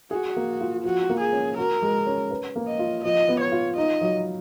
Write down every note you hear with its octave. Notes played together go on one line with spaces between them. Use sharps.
F#4 G#4
A#3
F4
F3 F#4
A#3
G#4
C#4
F#4 A#4
G#3
C#4
B4
A#3
D#5
F4
F3 D#5
B3
C#5
F4
D#4 D#5
F#3